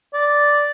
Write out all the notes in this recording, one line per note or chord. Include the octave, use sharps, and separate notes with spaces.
D5